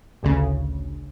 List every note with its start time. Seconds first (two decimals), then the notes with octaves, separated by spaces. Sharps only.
0.23 A1 D2 C#3